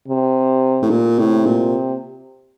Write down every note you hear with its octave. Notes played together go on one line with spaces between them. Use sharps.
C3
A2
A#2
A2 C3
A#2